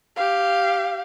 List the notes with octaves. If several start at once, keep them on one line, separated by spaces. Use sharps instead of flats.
G4 F5